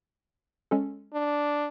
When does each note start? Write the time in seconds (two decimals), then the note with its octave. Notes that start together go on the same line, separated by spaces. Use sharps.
0.71 G#3 C#4 A4
1.14 D4